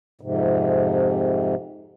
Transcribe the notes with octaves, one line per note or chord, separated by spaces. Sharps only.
F2 G#2 C3